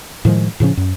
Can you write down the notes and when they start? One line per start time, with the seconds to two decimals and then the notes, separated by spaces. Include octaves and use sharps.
0.25 A2 D#3 F3 G#3
0.60 A2 C#3 F3 C#4
0.77 F#2